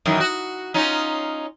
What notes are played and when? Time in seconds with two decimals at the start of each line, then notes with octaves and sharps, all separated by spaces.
0.06 F#2 D#3 E3
0.20 F#4
0.74 C#4 D#4 F4